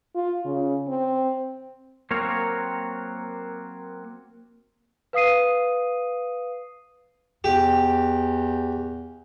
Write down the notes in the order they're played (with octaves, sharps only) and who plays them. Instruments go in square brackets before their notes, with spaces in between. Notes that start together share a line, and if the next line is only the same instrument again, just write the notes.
[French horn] F4
C#3
C4
[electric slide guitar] F#3 A#3 C4 A#4 C#5
[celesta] B4 F5 D#6 C7 D#7
[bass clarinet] E2 [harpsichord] G4